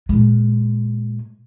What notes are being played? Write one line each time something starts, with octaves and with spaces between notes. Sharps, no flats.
A#2 G#3